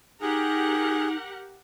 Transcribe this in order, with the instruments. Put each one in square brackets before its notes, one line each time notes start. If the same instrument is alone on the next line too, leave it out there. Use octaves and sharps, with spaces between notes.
[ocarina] D#4 [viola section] G4 A#4 F#5 [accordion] G#4